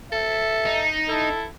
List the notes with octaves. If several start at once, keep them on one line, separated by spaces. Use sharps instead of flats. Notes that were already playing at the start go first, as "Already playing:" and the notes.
A4 E5
D#4
E4 A4